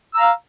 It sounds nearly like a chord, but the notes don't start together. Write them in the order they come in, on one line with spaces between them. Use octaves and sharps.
E6 A#5 F5